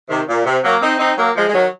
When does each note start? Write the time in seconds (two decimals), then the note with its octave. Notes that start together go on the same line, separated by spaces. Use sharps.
0.09 C3 D#3
0.28 A#2
0.45 C3
0.63 F#3 A#3
0.81 C4 D#4
0.99 C4 D#4
1.17 F#3 A#3
1.36 F3 G#3
1.48 G#3
1.53 D#3 F#3